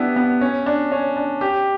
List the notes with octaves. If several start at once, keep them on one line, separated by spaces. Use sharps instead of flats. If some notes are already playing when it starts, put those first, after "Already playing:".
Already playing: B3 D4 E4 G4
B3
C#4
D4
C#4
D4
G4